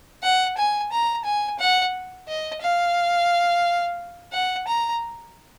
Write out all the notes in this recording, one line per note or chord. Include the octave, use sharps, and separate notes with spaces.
F#5
G#5
A#5
G#5
F#5
D#5
F5
F#5
A#5